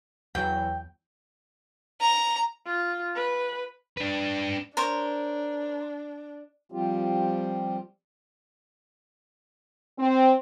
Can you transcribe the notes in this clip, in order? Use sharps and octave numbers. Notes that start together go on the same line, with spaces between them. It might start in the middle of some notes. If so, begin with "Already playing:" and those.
E2 E3 F#3 G5
A#5
F4
B4
D4 B4
D4 A#4 C5 C#5
F3 G3 C4 F4 G4
C4